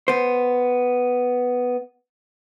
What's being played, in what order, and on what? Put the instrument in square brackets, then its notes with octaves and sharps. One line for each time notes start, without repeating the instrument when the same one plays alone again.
[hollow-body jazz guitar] B3 C5